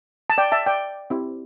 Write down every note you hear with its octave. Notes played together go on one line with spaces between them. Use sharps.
A5
D5 G5
E5 A5
D5 G5
C4 E4 G4